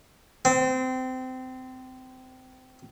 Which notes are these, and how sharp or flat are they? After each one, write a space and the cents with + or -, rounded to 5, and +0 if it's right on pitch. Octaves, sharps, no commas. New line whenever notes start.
C4 -25